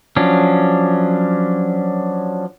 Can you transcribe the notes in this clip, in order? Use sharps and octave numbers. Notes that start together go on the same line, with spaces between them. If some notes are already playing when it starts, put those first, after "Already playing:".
F3 F#3 C#4 D4